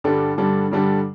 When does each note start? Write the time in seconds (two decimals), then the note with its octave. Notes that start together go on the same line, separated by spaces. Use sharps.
0.04 G2 D3 G3 D4 A4
0.38 G2 D3 G3 D4 A4
0.71 G2 D3 G3 D4 A4